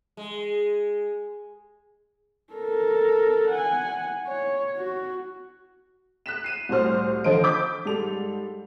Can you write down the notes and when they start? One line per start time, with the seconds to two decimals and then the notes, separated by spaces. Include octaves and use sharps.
0.17 G#3
2.53 A4 A#4
3.49 F#5 G#5
4.27 C#5
4.76 F#4
6.26 F#6 B6 E7
6.44 C7 D#7 E7
6.69 C2 A2 F#4 C5 F6
7.24 D3 F3 C5 D#5 F5 D7
7.44 D6 G6 B6
7.85 G#2 G3 A4 F7